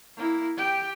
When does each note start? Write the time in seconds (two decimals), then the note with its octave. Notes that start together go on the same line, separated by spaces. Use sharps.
0.17 A#3 E4
0.57 G4 G5